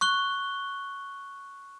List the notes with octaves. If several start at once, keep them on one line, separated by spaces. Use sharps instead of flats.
C#6 F#6 G7